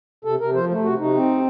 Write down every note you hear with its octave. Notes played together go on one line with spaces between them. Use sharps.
C3 A4
C3 A#4
F3 C5
A3
C3 F#4
C3 D#4
C4